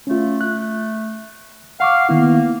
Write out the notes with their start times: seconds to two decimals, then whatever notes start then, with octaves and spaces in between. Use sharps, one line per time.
0.07 A3 C#4 F4
0.41 F#6
1.80 F5 F#5 C#6 D6
2.09 D#3 A#3 B3 E4